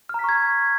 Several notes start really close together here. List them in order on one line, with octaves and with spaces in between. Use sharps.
F6 A#5 B6 C#6 G#6